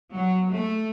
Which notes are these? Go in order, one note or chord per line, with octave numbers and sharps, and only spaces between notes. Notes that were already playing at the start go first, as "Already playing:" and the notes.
F#3
A3